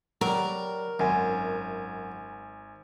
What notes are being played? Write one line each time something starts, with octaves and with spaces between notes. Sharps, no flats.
F#3 G3 A#4
G#1 F#2 G#5